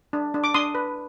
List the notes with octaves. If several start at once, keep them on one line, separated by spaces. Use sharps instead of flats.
D4
D4
D6
D4 C6 D#6
B4